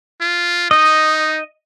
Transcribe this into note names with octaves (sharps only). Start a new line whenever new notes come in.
F4
D#4 D#5